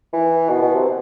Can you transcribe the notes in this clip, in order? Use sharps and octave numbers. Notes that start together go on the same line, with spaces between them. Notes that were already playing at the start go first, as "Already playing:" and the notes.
E3
B2
B2
C3